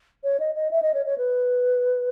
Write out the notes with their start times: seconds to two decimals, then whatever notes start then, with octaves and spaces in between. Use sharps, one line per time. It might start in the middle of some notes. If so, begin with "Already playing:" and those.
0.24 C#5
0.40 D#5
0.55 D#5
0.71 E5
0.82 D#5
0.94 C#5
1.06 C#5
1.18 B4